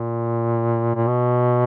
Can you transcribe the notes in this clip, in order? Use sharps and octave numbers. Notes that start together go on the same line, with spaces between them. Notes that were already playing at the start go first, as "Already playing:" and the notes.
Already playing: A#2
A#2
B2